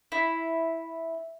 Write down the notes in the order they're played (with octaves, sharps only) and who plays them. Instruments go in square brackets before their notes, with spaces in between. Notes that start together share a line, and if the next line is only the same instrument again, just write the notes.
[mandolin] E4